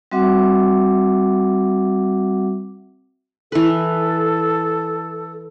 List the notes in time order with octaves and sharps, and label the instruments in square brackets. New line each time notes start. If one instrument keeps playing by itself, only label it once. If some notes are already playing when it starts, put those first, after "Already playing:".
[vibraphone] G3 C4 F#4 E5 F#5 D6
[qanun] E3 B4 [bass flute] A4